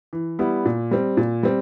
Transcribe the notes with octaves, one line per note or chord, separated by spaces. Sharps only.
E3
G3 B3 E4
A#2
G3 C4
A#2
G3 C4